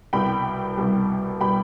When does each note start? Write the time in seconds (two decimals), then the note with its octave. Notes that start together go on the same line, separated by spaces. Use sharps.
0.13 C2 B2 G3 G5 B5
0.77 C2 B2 G3
1.40 B2 G3 G5 B5